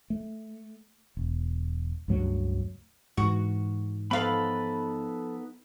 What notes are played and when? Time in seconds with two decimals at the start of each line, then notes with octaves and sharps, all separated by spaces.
0.10 A3
1.17 E1
2.08 C#2 G2 F#3 A3
3.17 G#2 E3 F#4
4.11 F3 B3 D#4 A4 B4 F5 B5